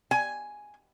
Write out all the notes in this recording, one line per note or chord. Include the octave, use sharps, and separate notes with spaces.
G#5